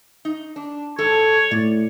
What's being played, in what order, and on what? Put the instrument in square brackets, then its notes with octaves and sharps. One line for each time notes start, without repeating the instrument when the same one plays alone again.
[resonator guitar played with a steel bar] D#4
D4
[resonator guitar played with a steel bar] G#2 A4 A5 [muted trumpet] C#5
[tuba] A2 [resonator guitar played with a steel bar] D5